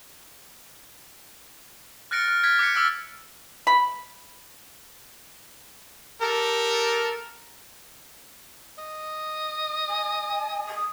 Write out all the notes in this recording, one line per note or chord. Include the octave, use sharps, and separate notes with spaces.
F6 F#6 A6 A#6 C#7 D7
F6
F6 G#6 A6 B6
D6 F#6 B6 C#7
D6 E6 F6 A6 D7
B5
G4 A4 A#4
D#5
G#5
D#6